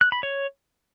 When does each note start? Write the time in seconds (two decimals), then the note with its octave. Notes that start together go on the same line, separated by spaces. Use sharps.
0.01 F#6
0.12 B5
0.23 C#5